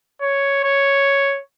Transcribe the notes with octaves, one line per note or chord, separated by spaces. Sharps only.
C#5
C#5